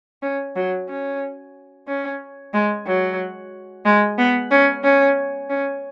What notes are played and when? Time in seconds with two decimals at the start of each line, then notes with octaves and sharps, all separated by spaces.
0.22 C#4
0.56 F#3
0.89 C#4
1.88 C#4
2.54 G#3
2.86 F#3
3.85 G#3
4.18 B3
4.51 C#4
4.84 C#4
5.50 C#4